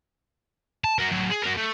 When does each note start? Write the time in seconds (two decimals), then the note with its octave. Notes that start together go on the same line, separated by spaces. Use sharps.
0.84 A5
0.99 F#4 A#4
1.11 A2 F#3
1.30 G#4
1.42 F#4 A#4
1.57 A3